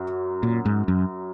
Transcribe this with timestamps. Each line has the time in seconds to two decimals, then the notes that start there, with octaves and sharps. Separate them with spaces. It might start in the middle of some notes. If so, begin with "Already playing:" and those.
Already playing: F#2 F#3
0.43 A#2
0.65 G#2
0.88 F#2